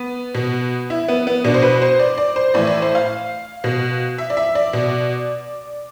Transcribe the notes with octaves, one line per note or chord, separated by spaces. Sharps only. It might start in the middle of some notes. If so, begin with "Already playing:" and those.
Already playing: B3
B2
E4
B3
B3
B2 D4
C5
B4
C5
D5
D5
C5
A2 E3 D5
D5
C5
F5
B2
E5
D5
E5
D5
B2